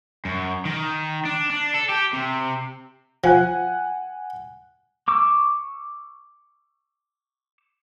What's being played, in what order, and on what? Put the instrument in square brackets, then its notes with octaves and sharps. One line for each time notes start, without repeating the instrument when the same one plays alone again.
[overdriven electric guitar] F#2
D#3
D4
D4
A4
G4
C3
[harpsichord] F3 [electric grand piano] F#5 G#5 F#6
[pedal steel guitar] C#6 D6 E6